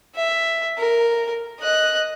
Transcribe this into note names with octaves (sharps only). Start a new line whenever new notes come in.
E5
A#4
D#5 F#6